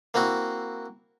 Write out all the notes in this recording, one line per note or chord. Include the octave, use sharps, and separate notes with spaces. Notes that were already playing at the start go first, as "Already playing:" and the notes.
A#3 C4 E4 F#4